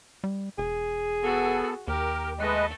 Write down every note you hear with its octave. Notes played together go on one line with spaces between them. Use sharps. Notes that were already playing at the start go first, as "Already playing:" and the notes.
G3
E1 G#4
B3 F#4 A4
D#2 G4 A#4
G#3 A3 B4 D#5